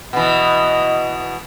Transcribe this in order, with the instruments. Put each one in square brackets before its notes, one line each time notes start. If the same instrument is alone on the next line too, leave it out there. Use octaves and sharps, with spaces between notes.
[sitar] B2 E3 [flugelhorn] D#5